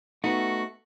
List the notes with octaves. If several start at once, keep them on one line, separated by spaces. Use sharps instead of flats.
A3 B3 D#4 F#4